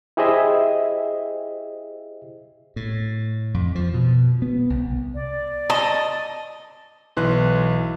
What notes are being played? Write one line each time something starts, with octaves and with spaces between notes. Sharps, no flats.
E4 G4 G#4 C5 D#5 E5
A2
F2
F3
B2
B3
C2
D5
D#5 A5
B1 E3 B4 C6 F#6